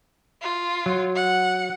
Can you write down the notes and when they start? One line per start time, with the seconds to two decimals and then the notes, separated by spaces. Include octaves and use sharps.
0.42 F4
0.86 F#3
1.16 F#5